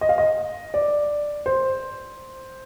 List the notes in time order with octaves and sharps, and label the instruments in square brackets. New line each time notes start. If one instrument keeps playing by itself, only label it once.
[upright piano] D#5
F5
D#5
D5
C5